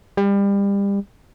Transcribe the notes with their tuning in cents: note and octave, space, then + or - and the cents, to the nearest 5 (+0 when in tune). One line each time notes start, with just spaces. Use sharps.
G3 +30